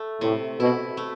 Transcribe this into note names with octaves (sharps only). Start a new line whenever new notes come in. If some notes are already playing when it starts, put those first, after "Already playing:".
Already playing: A3
A2 C3
B2 E4
A3